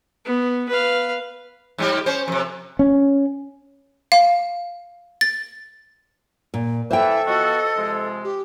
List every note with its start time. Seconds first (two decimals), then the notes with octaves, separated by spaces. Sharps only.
0.25 B3
0.69 B4 F5
1.78 G#2 G3 G4
2.06 C#4 C5
2.28 F2 C3
2.79 C#4
4.12 F5
5.21 A6
6.54 A#2
6.91 E3 A4 C5 E5 G5
7.27 F3 B3 F#4 D#5
7.76 C3 F3 G#3
8.24 G4